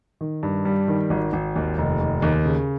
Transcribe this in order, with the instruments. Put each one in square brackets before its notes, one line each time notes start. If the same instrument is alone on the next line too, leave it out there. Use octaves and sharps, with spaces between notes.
[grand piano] D#3
G2
G3
D#3
G#1
G#1
D#2
F1
D#2
D#2
C#3